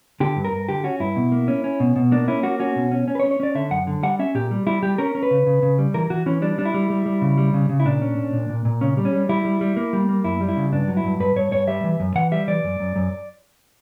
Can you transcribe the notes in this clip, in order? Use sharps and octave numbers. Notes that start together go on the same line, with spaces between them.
D3 G4
G2
A#4
G2
D3 G4
C#4 F#4
G2 E4
B2
A#3
C#4
C#4
B2
B2
A#3 D4
C#4 E4
A#3 F#4
C#4 F#4
B2
C#4
C#4
B4
C#5
C#4
C#5
C#4 D5
D3 E5
F#2 F#5
D3
G3 F#5
C#4 E5
A#2 G4
G3
G3 E4
G3 G4
C#4 A#4
C#4
B4
C#3
C#3
C#3
G3
E3 A#4
E3 F#4
E3 C#4
G3 D4
G3 D4
E4
G3
G3
G3
C#3
G3
C#3
C#3
E4
A#2 D4
C#4
A#2
A#2
A#2
A#2
C#3 C#4
G3
C#4
G3
G3 E4
G3
G3
A#3
G3
A#3
F#2 E4
G3
E4
C#3
G2 D4
F#3
E4
G2
G2 B4
G2 C#5
G2 C#5
G3 E5
E3
F#2
E3 F#5
G3 E5
E3 D5
F#2
F#2
F#2